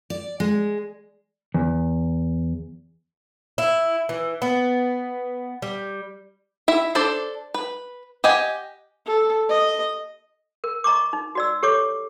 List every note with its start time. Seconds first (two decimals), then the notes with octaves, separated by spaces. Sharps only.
0.10 D5
0.40 G#3
1.54 E2
3.58 E4
4.09 E3
4.42 B3
5.62 G3
6.68 E4 E5
6.95 D4 A4 C5 D5
7.54 B4
8.24 G4 D#5 F#5 G#5
9.06 A4
9.49 D#5
10.64 A#4
10.84 D#5 A#5 C#6 D6
11.13 D#4
11.35 F#4 D5 E6
11.63 G4 A4 C#5 C#6 D6